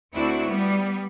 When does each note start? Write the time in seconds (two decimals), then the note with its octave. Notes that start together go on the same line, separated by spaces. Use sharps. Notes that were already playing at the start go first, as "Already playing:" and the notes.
0.13 D2 C4 D4 E4 F#4
0.47 G3 B3